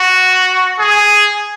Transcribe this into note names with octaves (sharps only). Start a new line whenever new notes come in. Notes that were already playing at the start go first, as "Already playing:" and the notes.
Already playing: F#4
G#4